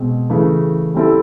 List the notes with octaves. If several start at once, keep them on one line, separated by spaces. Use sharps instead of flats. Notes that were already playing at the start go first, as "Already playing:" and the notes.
Already playing: B2 G#3 C4
C#3 E3 A3
G3 C4 E4 A4